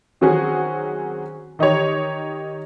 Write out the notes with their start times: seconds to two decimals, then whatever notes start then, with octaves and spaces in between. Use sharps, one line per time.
0.21 D#3 F#3 C4 C#4 F#4 G#4
1.59 D#3 D#4 G4 C#5